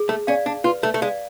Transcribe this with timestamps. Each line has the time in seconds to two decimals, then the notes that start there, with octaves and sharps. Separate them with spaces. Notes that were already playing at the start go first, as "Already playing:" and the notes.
Already playing: G#4
0.09 A3
0.27 C#4 D5 F5
0.46 D4
0.64 F4 B4
0.83 A3
0.94 A3
1.02 G#3 D5 F5